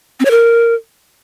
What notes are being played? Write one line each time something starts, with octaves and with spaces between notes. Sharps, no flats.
C4
C#5
A#4